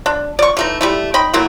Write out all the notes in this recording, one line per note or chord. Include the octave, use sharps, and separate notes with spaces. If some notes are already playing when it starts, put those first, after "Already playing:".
D4
D5 C#6
E3 A3 D#4
G3 A3 E4
D#4 G5 B5
F#3 A3 A#3 E4